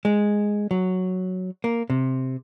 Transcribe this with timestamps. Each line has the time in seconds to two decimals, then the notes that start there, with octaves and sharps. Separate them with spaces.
0.05 G#3
0.71 F#3
1.64 A#3
1.90 C3